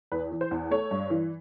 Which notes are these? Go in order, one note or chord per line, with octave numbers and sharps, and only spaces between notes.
E2 B4
E3
C5
E2
A3 C#5
G2
E3